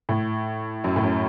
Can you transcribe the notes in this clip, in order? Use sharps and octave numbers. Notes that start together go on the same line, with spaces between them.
A2
F#2
A2
F#2